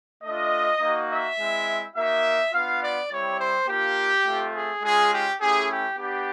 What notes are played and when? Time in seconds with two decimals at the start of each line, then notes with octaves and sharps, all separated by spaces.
0.24 A3 D4 F4 D#5
0.81 A#3 D#4 F#4
1.10 E5
1.38 G#3 C4 E4
1.96 A#3 D#4 F#4 E5
2.53 B3 D4 F4 F5
2.82 D5
3.10 G3 C4 E4 G4 C#5
3.39 C5
3.68 A#3 D4 F4 G4
4.25 A3 C4 F4
4.54 G#4
4.82 G#3 C#4 F4 G#4
5.11 G4
5.40 A3 C#4 E4 G4 G#4
5.69 G4
5.97 B3 D4 G4